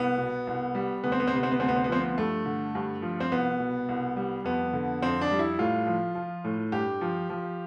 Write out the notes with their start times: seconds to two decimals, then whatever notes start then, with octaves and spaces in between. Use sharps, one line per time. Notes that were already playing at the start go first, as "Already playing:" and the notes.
Already playing: C2 B3
0.18 B2
0.47 C2
0.75 G3
1.04 D2 B3
1.12 C4
1.20 B3
1.27 C4
1.32 C3 B3
1.43 C4
1.51 B3
1.60 D2 C4
1.68 B3
1.76 C4
1.84 B3
1.89 F3 C4
2.00 B3
2.18 G2 A3
2.46 D3
2.75 G2
3.02 F3
3.20 C4
3.32 C2 B3
3.60 B2
3.89 C2
4.16 G3
4.44 F2 B3
4.73 D3
5.02 F2 C4
5.21 D4
5.31 G3
5.39 E4
5.59 A2 F4
5.87 F3
6.15 F3
6.44 A2
6.72 G2 G4
7.01 F3
7.30 F3